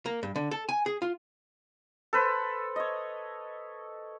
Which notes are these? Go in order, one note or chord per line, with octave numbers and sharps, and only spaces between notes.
A#3
G2
D3
A4
G#5
G#4
F4
A4 B4 C5
C#5 D#5